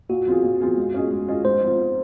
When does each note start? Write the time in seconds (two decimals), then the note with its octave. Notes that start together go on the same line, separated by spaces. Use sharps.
0.09 A#2 F#4
0.26 F3 C4 F4 G#4
0.43 A#2
0.61 F3 C4 F4 G#4
0.77 G#3
0.94 C#4 F4 G#4 D#5
1.11 G#3
1.28 C#4 F4 G#4 D#5
1.45 G#2 C5
1.62 F3 C4 F4